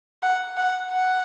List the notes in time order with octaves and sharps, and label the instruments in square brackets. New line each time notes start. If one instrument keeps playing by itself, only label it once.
[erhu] F#5
F#5
F#5